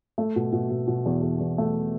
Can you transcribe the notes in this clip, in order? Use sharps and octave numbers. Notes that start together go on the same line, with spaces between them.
A3
B2
B2
B2
B2
E2
E2
E2
A3